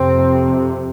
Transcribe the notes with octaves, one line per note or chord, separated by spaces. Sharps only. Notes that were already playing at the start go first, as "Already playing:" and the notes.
Already playing: F2 C3 C4